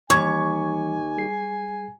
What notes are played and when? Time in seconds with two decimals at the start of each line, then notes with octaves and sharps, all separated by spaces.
0.10 D#2 E3 G3 G#5 C#6 G#6
1.18 G3 G#4 C7